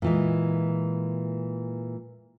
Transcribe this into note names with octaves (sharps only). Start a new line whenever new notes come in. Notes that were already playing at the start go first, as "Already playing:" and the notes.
A#2 E3 G#3